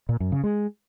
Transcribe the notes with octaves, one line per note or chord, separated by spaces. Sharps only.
A#2
F#2
C#3
G#3